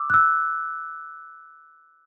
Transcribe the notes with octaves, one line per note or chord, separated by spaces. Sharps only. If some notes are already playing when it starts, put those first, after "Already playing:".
Already playing: D6 E6
F#6
E6